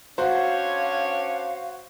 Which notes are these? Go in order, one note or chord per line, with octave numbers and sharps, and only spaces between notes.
C#4 D4 F#4 C5 C#5 F5